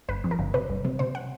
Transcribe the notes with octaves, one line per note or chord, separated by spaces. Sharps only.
G1 B4
F2
A#4
G1
C3 B4
G1
C3
C3 C5
F#5